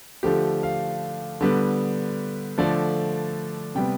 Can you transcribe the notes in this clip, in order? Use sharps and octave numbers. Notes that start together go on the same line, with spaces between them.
D3 F3 A3 G4
F5
D3 G3 B3
D3 F3 A3 D5
C3 G3 B3 G5